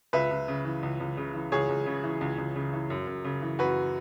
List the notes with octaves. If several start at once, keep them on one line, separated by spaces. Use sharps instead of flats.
C#2 B4 E5
C#2
C#3
E3
C#2
C#2
C#3
E3
C#2 G#4 C#5
C#2
C#3
E3
C#2
C#2
C#3
E3
F#2
F#2
C#3
E3
F#2 F#4 B4